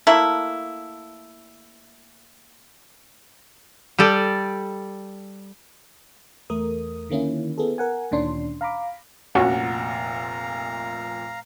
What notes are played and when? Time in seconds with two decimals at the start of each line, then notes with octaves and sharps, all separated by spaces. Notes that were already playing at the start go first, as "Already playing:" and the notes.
0.07 A3 A#3 E4
3.99 G3 G4 A4 D5
6.50 E2 A3 A#4 D#6
7.09 D3 D#3 A#3 C#4 E4
7.58 B3 E4 G#4 A4
7.78 A#4 F#5 G#5
8.11 D2 A#2 D#3 C#4 D4 C6
8.61 F5 A#5 B5 D6
9.35 F1 A#2 C#4 F4 F#4 F5 F#5 A#5